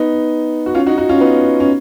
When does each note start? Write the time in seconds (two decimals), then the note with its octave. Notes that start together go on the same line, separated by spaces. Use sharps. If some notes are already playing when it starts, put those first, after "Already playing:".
Already playing: B3 D#4
0.66 F#4
0.75 C#4 F4
0.86 D#4 F#4
0.98 D#4 F#4
1.09 C#4 F4
1.21 B3 D#4
1.60 C#4